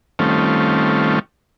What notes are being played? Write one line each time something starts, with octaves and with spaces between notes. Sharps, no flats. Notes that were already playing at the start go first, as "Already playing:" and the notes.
D#3 G3 A3 C4 C#4 F4